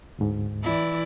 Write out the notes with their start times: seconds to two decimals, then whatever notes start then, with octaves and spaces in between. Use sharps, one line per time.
0.19 D2 G#2
0.63 E3 E4 D5